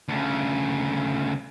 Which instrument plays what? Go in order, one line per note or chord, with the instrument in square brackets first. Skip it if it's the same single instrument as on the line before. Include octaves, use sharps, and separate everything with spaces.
[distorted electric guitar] D2 C#3